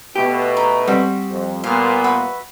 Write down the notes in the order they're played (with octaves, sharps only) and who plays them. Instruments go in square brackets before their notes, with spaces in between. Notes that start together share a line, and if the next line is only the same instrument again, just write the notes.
[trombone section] B2 A3 [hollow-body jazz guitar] G4
[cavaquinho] D#4
[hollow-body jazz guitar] G3 C4 [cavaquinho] F#4
[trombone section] F2
[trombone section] A#2 B3 [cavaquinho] F5
[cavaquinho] F#4 B4 E5